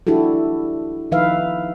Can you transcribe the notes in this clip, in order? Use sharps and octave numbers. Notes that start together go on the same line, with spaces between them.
D4 E4 F#4 G4 A4
D#3 F3 D#4 B4 E5 F5